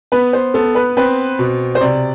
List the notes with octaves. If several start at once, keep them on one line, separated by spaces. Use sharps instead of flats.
B3 B4
C5
B3 A4
B4
C4 B4
B2
C5
C3 D5